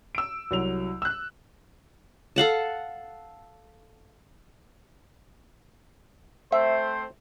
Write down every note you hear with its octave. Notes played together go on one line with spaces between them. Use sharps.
E6 D7
C2 F#3 F7
E6 F#6
A4 F5 F#5 A5
A3 C4 C5 E5